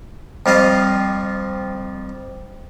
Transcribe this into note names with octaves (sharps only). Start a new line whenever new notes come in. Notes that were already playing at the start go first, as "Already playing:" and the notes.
F2 G3 F4 D#5